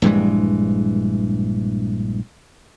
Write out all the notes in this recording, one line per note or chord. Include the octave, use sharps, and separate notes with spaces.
A#1 G2 E3 G#3